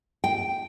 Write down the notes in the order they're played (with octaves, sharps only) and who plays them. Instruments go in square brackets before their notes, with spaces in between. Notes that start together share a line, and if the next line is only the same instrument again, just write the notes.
[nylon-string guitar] G5